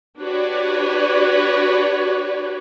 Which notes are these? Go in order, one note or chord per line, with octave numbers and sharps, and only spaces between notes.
D4 F#4 G4 B4 C#5 D5